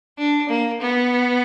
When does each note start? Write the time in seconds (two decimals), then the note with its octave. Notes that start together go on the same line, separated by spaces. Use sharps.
0.18 D4
0.49 A#3
0.81 B3